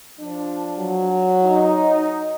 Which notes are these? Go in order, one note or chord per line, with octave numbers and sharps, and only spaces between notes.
F3 D4
F#3
D#4